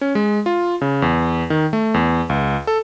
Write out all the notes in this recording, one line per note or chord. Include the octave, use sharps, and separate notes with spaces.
C#4
G#3
F4
C#3
E2
D#3
A3
E2
C#2
A4